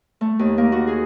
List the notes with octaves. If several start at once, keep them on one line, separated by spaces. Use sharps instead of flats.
A3
D#2
A#3
F#4
G#4